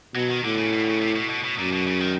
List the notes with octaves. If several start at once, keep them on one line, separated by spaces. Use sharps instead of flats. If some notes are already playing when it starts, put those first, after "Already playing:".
B2 F#3
D#3
A2 D3
C#3
B2
D3
C#3
C3
B2
B2
B2
F#2 A#2
B2
C#3
D#3